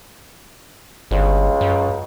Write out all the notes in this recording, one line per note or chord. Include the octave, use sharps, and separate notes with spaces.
G1 C#2
F#2